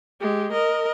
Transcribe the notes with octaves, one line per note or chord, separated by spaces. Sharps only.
G#3 G4
A#4 D#5